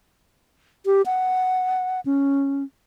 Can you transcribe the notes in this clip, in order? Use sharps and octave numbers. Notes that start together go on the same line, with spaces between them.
G4
F#5
C#4